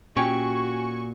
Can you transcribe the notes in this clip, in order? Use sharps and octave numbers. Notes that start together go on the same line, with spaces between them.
A#2 C#4 F#4 G4 G5 G#5 C#6